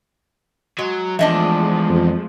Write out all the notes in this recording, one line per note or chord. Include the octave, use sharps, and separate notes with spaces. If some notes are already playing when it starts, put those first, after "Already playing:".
F#3 G#3
E2 F3 G#3 A3 D4 D#5 E5
F2